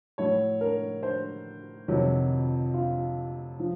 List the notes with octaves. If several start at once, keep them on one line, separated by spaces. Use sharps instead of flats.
A2 F#3 C#5
A#4
C5
F2 C3 D#3 F#3
F4
F3